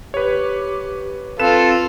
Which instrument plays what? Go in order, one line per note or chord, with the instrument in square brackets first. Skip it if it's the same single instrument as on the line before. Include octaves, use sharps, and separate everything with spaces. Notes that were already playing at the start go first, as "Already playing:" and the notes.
[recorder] G4 [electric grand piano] B4 C#5
[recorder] C4 [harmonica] F4 [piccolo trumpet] A4 [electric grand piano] B4 E7